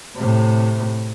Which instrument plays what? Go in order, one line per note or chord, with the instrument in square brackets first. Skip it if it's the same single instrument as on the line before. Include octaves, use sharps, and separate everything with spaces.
[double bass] A2 C3